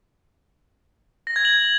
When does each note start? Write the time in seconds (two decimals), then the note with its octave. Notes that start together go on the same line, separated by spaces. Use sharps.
1.27 A#6
1.36 G#6
1.45 F#7